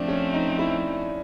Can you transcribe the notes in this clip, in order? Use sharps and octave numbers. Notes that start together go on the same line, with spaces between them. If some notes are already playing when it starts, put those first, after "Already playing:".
Already playing: F3 A3 C4 D4
C#4
D#4
E4